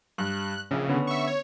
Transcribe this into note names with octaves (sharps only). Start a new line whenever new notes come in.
G2 F#6
A#1 C#3
D3 B3 C#4
E5 C#6
C#5